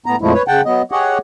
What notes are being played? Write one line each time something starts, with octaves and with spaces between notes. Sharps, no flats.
A2 B3 A#5
F2 A#2 F3 G#3 A3 E4
B4 C#5
C#3 F#5 G5 A5
F#3 B3 D#5
G4 G#4 C#5 D#5 F#5